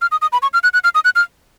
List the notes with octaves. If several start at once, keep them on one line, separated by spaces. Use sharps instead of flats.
F6
D#6
D#6
B5
C#6
F6
F#6
F#6
F6
D#6
F#6
F6